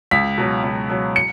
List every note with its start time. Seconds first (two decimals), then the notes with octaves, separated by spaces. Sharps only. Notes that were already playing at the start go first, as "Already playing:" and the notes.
0.11 C#2 B6
0.38 B2 F#3
0.64 C#2
0.90 B2 F#3
1.16 C#7